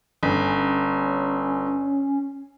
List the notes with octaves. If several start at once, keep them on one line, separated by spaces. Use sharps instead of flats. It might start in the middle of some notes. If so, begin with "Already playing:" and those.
G1 C#4